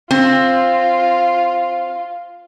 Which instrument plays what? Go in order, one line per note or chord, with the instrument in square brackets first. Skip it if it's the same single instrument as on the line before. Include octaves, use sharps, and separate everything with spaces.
[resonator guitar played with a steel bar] C4 [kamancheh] F4